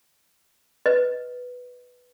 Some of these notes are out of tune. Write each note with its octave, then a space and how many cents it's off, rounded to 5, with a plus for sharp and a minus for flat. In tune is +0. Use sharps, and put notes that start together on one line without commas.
B4 +0 D#5 +0